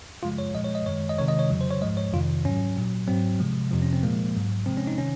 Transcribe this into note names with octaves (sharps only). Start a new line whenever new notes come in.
F#2 C#3 F3 G#3 F4
C#5
A#2 F3 G#3 D#5
C#5
D#5
F#2 D#3 G#3 C#5
D#5
C3 D#3 G#3 C#5
D#5
C#5
F2 C#3 F#3
C5
C#5
G#2 F3 G#3 D#5
C#5
F2 C3 D#3 F4
G#2 F#3 C#4
A#2 F#3
G#2 F#3 C4
C3 F3 G#3
F2 C3 F3
C#4
C4
A#2 F3 G#3 A#3
G#2 F#3
C3 F3 G#3 C4
C#4
D#4
C3 D#3 C#4